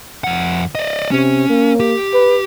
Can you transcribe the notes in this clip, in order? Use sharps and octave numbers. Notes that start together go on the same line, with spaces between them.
F2 F#5
D5 D#5
C3 C#4
A#3
G4
B4